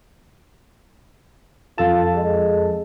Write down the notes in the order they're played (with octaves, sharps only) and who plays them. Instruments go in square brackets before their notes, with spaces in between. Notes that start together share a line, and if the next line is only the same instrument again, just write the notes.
[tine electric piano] F2 A4 A5 [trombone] F4
[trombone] G#3